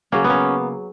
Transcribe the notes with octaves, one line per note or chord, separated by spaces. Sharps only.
C#3 F#3 A#3 C#4
B3
C#4